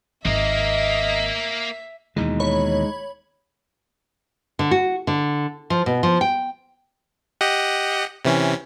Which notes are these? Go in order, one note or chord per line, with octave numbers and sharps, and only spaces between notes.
G#1 A#3 A#4 D#5 E5
D#2 B2 E3 G#3 D#4
C#5 B5
D3
F#4
D3
F3
B2
F3
G5
G4 D#5 F#5
C3 E3 C#4